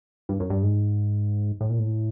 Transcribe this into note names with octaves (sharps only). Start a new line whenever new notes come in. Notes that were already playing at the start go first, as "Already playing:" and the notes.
G2
F#2
G2
G#2
A2
A#2
A2